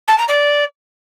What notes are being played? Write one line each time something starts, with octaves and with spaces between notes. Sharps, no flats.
A5
A#5
D5